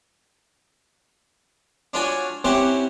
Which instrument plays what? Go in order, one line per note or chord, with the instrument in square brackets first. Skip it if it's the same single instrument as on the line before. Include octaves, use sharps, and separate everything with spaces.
[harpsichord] D4 F4 F#4 C#5 G#5
C4 C#4 E4 G4 C5 F#5